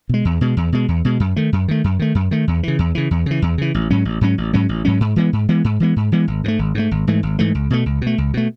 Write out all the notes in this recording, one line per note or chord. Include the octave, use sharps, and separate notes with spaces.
B2 G#3
E2
B2 G#3
E2
B2 G#3
E2
B2 G#3
F#2
D#3 A3
F#2
D#3 A3
F#2
D#3 A3
F#2
D#3 A3
E2
C#3 E3
E2
C#3 E3
E2
C#3 E3
E2
C#3 E3
A1
G#2 F#3 C#4
A1
G#2 F#3 C#4
A1
G#2 F#3 C#4
A1
G#2 F#3 C#4
G#2
E3 G#3 B3
G#2
E3 G#3 B3
G#2
E3 G#3 B3
G#2
E3 G#3 B3
G#1
G#2 E3 A3
G#1
G#2 E3 A3
G#1
G#2 E3 A3
G#1
G#2 E3 A3
C#2
B2 A3
C#2
B2
A3
C#2
B2 A3